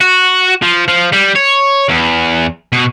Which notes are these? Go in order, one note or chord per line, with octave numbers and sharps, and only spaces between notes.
F#4
F3
F3
G3
C#5
E2
B2